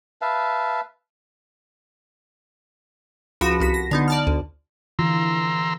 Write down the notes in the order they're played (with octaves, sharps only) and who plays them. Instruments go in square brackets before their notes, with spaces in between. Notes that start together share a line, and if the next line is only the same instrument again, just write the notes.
[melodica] B4 E5 F5 A5
[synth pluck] C#2 F3 F#4 B5 A#6 E7
C2 F#4 B6
A#6
D3 B3 D#4
D5 A5 F6
D2
[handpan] D3 E3 F4 [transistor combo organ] A#5 C6 E6